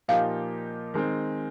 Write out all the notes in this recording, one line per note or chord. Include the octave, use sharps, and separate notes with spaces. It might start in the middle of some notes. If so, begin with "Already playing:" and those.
A#2 F3 A#3 D#4 G4 F5
D#3 G#3 C4